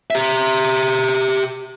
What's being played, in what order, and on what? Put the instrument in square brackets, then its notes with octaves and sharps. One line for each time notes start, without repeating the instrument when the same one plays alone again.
[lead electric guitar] G4 E5